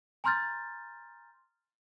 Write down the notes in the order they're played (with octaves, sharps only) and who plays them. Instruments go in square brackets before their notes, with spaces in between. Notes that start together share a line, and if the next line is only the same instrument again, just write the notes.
[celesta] G#5 A#5 C6 F6 G6 A6